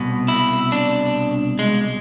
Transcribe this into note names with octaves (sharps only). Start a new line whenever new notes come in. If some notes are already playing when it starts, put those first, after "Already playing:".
Already playing: C2 B2
E4
D4
G#3